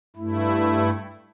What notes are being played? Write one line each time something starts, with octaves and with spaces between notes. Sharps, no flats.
G2 A3 E4